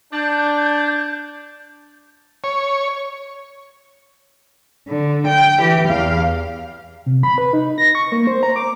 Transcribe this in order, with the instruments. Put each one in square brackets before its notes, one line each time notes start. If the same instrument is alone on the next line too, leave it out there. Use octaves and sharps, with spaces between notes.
[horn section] D4 [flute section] G6
[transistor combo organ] C#5
[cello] D3
G5
E3 G4
E2 F5
[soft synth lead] C3
B5
B4
D#4
A#6
C#6
A#3
C5
A#5
D6